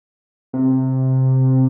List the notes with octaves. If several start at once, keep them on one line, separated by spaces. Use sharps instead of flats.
C3